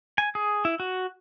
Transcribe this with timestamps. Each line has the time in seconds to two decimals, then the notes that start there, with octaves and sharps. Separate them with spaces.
0.18 G#5
0.35 G#4
0.65 E4
0.80 F#4